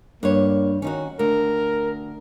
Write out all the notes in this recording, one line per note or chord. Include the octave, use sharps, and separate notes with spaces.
G2 A#3 C#5
D#3 C#4 D#4 F#4
D2 A#4